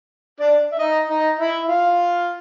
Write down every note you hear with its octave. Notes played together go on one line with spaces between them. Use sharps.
D4 D5
E5
D#4 D#5
D#4 D#5
E4 E5
F4 F5